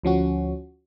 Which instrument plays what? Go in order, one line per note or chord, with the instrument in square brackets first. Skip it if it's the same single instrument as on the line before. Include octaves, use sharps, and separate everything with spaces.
[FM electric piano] D2 F3 C#4 F#4